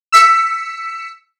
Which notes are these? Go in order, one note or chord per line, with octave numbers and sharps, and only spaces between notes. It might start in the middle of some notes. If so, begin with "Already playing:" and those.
E6 B6 C#7